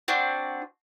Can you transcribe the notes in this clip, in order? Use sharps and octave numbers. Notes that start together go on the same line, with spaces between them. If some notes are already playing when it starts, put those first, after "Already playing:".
C4 D4 F#4